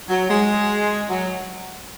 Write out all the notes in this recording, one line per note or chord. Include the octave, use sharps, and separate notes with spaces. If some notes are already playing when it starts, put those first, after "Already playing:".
F#3
G#3
F#3